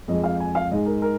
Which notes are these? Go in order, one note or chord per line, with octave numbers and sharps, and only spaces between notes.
F2 F3 G#3 D#5
F5
G#5
F5
G#2 G#3 D#5
A#4
A#4